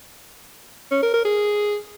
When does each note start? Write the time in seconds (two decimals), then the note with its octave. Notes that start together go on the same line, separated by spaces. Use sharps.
0.91 C#4
1.02 A#4
1.14 A#4
1.25 G#4